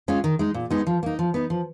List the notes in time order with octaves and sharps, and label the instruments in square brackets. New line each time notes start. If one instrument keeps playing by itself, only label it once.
[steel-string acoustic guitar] G#3 C#4 F4
D#3
G#3 D#4
A#2
G#3 B3 D#4
F3
A#3 D#4
F3
B3 D#4
F3